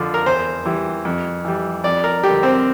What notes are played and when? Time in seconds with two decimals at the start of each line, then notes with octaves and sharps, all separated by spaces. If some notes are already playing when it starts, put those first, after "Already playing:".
Already playing: F2 D3 F3
0.14 A#4
0.26 E2 C5
0.66 E3 G3
1.05 F2
1.45 E3 G3
1.84 F2 D5
2.04 A#4
2.24 D3 G3 G4
2.43 C4